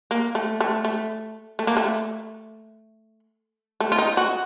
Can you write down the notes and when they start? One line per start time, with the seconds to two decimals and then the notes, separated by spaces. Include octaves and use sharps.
0.11 A#3
0.35 A3
0.61 A3
0.85 A3
1.59 A3
1.67 A#3
1.77 A3
3.80 A3
3.92 F4
3.99 D#4
4.17 F#4